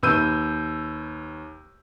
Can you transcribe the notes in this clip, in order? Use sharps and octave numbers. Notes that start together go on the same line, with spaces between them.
D#2 B4 E6 G6 D#7